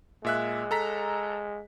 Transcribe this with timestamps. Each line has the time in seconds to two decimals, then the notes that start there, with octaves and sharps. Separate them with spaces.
0.25 A#2 G#3 E5 F#6
0.71 A4 A#5 B6